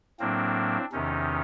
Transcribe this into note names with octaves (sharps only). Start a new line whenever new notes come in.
A2 F#3 A#3 C4 D4
E2 C3 D#3 C#4 D#4